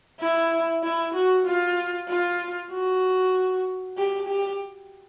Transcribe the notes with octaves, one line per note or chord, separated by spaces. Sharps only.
E4
E4
F#4
F4
F4
F#4
G4
G4